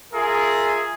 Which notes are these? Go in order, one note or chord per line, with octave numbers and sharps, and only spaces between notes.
F4 G#4 A#4 E5